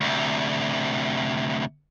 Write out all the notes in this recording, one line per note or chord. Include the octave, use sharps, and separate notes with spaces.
D2 C3